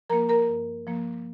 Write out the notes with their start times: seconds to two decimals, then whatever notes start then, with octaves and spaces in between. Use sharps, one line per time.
0.10 F3 A#3 A#4 A#5
0.29 A#4 A#5
0.48 G2
0.87 F3 A#3